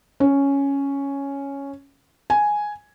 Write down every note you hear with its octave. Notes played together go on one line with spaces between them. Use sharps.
C#4
G#5